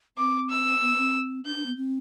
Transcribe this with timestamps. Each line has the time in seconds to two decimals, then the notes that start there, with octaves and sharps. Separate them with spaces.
0.17 C4 D6
0.50 E6
0.81 B3
0.98 C4
1.45 D4 G6
1.56 D4
1.66 B3
1.77 C4